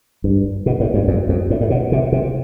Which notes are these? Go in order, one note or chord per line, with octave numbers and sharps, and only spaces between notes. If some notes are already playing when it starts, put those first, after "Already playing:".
G2
B2
A2
G2
F2
F2
A2
A2
B2
C3
C3